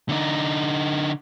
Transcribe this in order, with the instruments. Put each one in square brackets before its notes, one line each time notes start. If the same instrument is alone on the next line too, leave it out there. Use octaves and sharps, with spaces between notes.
[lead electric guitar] D3 D#4